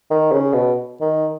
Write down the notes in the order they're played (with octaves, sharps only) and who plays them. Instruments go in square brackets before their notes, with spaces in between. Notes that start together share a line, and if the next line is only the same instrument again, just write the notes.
[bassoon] D#3
C#3
B2
D#3